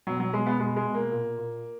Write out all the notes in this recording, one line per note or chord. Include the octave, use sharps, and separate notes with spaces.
B2 F#3
F#3
B2 G#3
B3
B2 G#3
G#3
B2
A#3
A#2
A#2